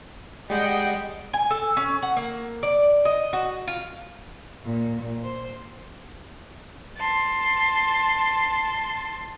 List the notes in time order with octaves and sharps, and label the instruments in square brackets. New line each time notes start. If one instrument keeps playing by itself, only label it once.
[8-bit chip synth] G3 G#3 [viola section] D#5 [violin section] F#5 G5
[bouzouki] G#5
A4
C#4
F#5
A#3
D5
D#5
F#4
F4
[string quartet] A#2
C5
A5 C6